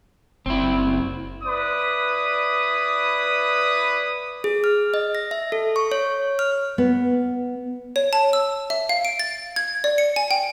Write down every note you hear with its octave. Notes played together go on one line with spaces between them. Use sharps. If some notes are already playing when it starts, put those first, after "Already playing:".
F#1 C4 E4
E4 B4 D5 D#6
G#4
F6
D#5
A#6
E5
A4
C#6
C#5
F6
B3
C#5
A5
E6
E5
F5
D7
A6
G#6
D5
C#7
G#5
G5